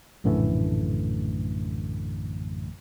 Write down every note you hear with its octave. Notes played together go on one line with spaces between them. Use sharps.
A#1 F#2 A2 D3 E3 A3